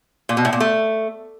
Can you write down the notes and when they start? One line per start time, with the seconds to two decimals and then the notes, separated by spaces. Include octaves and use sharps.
0.29 A#2
0.37 B2
0.45 A2
0.53 A#2
0.60 A3